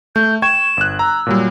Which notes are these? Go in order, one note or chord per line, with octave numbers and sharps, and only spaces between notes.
A3 G6
G5 C#6 G#6 E7
G1 F#6
A#5 E6
A#2 F#3 G3